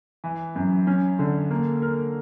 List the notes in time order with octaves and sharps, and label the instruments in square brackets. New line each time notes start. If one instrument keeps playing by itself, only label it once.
[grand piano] E3
F#2
C#4
D3
A#3
A#4